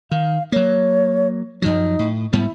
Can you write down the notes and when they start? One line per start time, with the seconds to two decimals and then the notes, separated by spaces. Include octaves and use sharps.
0.11 D#3 F5
0.52 F#3 A#3 C#5
1.62 F#2 F3 F#3 D#4
1.99 A2
2.33 G#2 G3 B3 E4